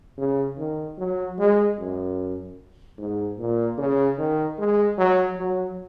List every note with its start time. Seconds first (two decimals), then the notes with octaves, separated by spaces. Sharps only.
0.18 C#3
0.58 D#3
0.98 F#3
1.38 G#3
1.78 F#2
2.98 G#2
3.38 A#2
3.78 C#3
4.18 D#3
4.58 G#3
4.98 F#3
5.37 F#3